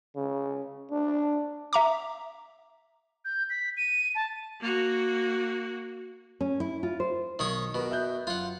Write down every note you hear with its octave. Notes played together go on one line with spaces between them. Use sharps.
C#3
D4
E5 A#5 D6
G6
B6
D#7
A5
A#3 F#4
C#4
E4
F4
C5
B1 D#3 C#5 D#6
B2 F#4 A#4
E5 F#6 G6
F#2 F4 F#5